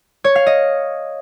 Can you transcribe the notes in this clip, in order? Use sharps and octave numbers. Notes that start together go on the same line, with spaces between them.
C#5
F5
D#5